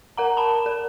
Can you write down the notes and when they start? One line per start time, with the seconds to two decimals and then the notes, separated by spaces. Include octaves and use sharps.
0.17 A#4 F#5 A#5
0.37 A5 B5 E7
0.66 A#4